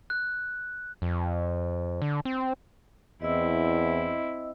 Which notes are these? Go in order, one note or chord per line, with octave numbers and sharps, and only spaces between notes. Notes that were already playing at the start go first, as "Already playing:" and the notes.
F#6
F2
D3
C4
E2 C4 E4 D#5 E6